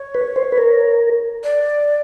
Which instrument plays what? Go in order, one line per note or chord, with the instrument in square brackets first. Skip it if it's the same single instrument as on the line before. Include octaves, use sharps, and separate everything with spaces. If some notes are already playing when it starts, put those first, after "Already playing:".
Already playing: [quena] C#5
[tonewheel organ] B4
C5
B4
A#4
[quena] D5